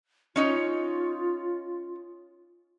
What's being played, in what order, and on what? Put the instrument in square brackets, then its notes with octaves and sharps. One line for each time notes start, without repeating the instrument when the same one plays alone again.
[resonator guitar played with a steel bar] C#4 D#4 C#5 [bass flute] F4